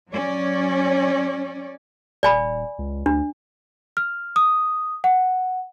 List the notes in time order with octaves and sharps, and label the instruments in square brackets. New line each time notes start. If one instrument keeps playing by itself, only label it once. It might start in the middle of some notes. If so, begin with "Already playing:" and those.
[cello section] F#3 C#4 C#5 D5
[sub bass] D#1 [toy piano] D5 G#5 B5
[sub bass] C#2
[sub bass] D2 [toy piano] D4
[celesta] F6
D#6
F#5